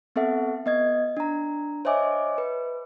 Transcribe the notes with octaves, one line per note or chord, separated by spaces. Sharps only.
B3 C4 A4 E5 F#5
B3 D#5 G#6
D4 A#5
C5 C#5 D#5 E5 G#5 D6
B4